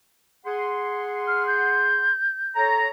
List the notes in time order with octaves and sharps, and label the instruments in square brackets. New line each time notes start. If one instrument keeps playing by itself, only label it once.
[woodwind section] G#4 F#5 C6
[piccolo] F6
G6
[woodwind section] A4 C#5 A#5